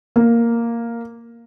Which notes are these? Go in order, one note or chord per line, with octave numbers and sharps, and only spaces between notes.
A#3